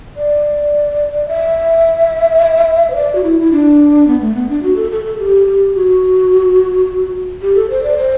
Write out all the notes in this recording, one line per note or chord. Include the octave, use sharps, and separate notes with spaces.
D5
E5
C5
D5
F#4
E4
E4
D4
B3
A3
B3
D4
F#4
A4
A4
A4
G4
G4
F#4
G4
A4
C5
D5
C5